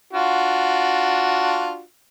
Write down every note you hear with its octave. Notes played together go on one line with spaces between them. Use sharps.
D4 F4 F#4